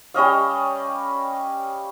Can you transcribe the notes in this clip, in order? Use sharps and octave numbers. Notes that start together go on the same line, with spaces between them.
G3 C#4 D#5 F5